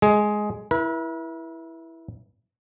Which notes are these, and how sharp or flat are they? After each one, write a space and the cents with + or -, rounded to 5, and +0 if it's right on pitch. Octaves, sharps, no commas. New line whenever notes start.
G#3 +10 G#4 +10
E4 +0 B4 -45